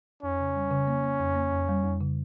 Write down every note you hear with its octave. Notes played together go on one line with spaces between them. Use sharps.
F2 C#4
C#3
G3
C#3
A#3
A#3
F2
A#3
F2
G3
F2
C#3